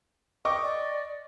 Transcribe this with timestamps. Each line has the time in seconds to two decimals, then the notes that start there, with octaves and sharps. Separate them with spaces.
0.45 D#5 G5 C#6 D6
0.62 D5